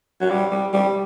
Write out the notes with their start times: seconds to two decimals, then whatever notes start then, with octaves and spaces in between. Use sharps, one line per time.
0.21 F#3
0.30 G3
0.51 G3
0.74 G3